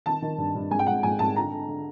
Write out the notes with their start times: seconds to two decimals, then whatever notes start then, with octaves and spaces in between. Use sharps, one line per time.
0.06 D#3 A5
0.22 D#3
0.38 G2
0.55 G2
0.71 G#2 G#5
0.79 G5
0.87 G#2 F#5
1.03 G#2 G#5
1.19 G#2 A5
1.36 D3 A#5
1.52 D3
1.68 D3